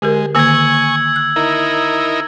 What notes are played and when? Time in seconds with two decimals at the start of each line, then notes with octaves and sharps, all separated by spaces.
0.02 D3 G#3 G4 A#4
0.35 D3 D#3 A#3 G#5 C#6 E6 G#6
1.16 F#6
1.36 D#4 E4 A#4